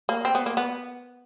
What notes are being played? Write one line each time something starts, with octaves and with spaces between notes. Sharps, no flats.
A#3
C4
B3
A#3
B3